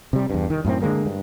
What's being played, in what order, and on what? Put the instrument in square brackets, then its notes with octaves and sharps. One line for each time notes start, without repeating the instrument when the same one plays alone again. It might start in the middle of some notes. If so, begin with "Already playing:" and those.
[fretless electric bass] C3 G3
E2 G2
D#3
F#2 A2 A3 C4
D3 F#3 G#3 A#3
G2